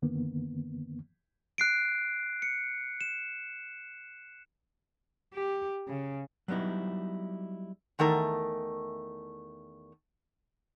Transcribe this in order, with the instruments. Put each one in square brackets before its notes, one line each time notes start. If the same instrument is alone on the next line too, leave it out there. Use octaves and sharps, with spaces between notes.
[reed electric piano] F#2 D3 D#3 A#3 B3
[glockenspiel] F#6 C7 D7
C#7
E7
[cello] G4
C#3
[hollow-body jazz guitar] F#3 G3 B3 D#4 E4
[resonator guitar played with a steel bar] E2 D#3 A3 A#4